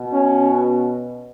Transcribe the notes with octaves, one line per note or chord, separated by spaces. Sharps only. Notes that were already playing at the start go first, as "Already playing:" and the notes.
Already playing: B2
C#4